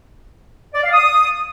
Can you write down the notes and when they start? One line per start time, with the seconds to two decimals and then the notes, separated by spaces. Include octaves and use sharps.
0.74 D5
0.83 F5
0.93 D#6